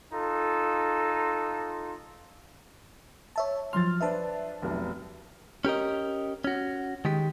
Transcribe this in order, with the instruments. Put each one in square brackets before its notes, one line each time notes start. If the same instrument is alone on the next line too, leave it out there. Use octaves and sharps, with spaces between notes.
[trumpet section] D#4 F4 A4
[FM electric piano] C#5 E5 A5
[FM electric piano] F3 F#3 F6 [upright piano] C6 A6
[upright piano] D4 B4 C5 [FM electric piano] E5 A5
[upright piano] F1 B1
[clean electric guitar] C#4 G4 A#4 D#5
C#4 F#4
D#3 G#3 G4